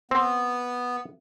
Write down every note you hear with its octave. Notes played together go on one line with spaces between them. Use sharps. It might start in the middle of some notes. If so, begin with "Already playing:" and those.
B3 C4